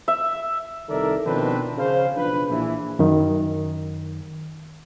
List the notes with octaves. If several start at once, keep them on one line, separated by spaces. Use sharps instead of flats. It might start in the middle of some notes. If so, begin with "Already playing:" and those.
E5
C2 D#3 A4 A#4 D5 E5
B2 D#3 F3 C4 D4 B4
C#3 C5 F5
B1 F3 D4 B4
A#1 E3
F#2 D#3